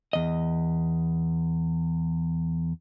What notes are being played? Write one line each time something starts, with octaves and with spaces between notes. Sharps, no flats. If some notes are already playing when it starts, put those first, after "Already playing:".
E2 D#5